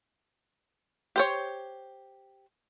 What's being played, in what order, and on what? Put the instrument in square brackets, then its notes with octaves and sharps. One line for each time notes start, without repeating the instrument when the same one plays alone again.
[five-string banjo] G4 C5 C#5